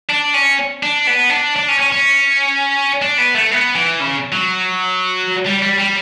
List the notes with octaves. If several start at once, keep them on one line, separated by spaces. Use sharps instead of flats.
D4
C#4
D4
B3
D4
D4
C#4
C#4
C#4
D4
B3
A3
B3
E3
C#3
F#3
G3
G3
G3